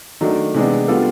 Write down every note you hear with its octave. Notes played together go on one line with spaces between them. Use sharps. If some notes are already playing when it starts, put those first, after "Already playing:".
D#3 F#3 A3 D4
C3 E3 G#3 B3 D4
G3 B3 D4 F4 A4